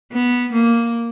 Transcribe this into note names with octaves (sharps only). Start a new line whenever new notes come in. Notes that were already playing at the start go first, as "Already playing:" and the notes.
B3
A#3